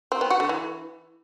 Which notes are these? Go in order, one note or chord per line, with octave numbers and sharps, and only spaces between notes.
C4
B3
F#4
D3
E3